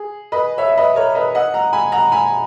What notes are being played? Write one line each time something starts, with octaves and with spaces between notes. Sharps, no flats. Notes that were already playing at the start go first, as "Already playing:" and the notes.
Already playing: G#4
B4 D#5
C#5 E5
E5
B4 D#5
A#4 C#5
B4 D#5
D#5 F#5
F#5 A#5
G#5 B5
F#5 A#5
G#5 B5